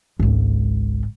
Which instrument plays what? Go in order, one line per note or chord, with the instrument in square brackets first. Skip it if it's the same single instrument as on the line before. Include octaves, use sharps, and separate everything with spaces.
[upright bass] G#1 C#2